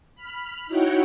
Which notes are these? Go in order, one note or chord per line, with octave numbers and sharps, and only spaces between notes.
B5 F6
D#4 E4 F#4 C#5 F#5 G5